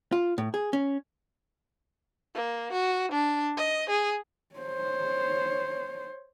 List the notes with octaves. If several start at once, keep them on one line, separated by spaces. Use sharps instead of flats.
F4
A2
G#4
C#4
A#3
F#4
D4
D#5
G#4
C5 C#5